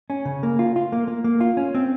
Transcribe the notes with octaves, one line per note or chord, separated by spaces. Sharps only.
C#4
C#3
A#3
F4
F4
A#3
A#3
A#3
F4
C#4
C4